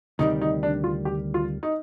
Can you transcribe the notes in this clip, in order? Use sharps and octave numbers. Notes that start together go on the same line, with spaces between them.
D2 C3 D#3 G3 D#4
D#4
D4
F4
G4
F4
D#4